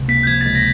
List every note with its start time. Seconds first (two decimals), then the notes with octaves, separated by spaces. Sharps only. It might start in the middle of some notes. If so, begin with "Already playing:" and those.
Already playing: C#2 C3
0.08 A#3 B6
0.23 G6
0.27 F3 G#6
0.41 A6
0.45 C#2
0.55 A#6